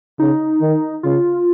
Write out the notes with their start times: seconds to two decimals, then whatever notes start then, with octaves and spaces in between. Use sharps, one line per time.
0.19 C#3 D#4
0.61 D#3
1.03 C#3 F4